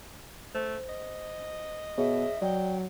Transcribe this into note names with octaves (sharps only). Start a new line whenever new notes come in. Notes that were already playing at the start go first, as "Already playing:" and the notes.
A3 C5
D#5
B2 G#4 C#5 E5
F#3 D5 G5